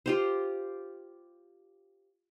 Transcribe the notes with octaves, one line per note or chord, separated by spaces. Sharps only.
F4 G4 C5